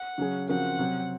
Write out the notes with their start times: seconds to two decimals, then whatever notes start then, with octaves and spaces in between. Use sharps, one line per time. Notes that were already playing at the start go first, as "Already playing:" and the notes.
Already playing: F#5
0.18 C#3 F#3 C#4 G#4
0.48 C#3 F3 C4 F#4 A#4 F#5
0.79 C3 F#3 C4